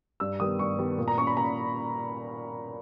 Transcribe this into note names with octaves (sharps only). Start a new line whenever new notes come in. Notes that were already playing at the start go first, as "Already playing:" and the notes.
G2 E6
D#3 G3 B3 D#6
G2 C#6
D#3 G3 B3
A#2
A#5
A#3 C#4 C#6
B5
A#2 A#5